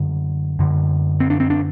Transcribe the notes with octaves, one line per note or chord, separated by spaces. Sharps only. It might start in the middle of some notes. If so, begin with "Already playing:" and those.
Already playing: F#2 D3
F#2 D3
C4
D4
C4
D4